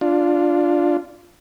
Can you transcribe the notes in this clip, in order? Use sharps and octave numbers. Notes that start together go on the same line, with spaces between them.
D4 F4